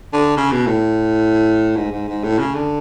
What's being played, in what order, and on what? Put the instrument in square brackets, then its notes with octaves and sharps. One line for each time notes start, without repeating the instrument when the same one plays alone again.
[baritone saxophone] D3
C#3
B2
A2
G#2
G#2
G#2
A2
C#3
D3